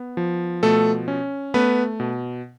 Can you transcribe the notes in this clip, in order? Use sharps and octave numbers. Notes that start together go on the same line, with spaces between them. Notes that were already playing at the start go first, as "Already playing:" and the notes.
Already playing: B3
F3
B2 A3 A4
C#4
A3 B3 B4
B2